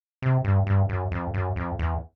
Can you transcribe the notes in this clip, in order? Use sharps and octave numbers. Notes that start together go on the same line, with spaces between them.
C3
G2
G2
F#2
F2
F#2
F2
E2